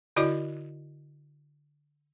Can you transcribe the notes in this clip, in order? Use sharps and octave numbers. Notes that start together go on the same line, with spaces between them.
D3 E4 F#4 D5 D#5 D6